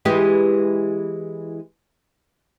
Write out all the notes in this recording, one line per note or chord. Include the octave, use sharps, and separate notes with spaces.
E3 G#3 G4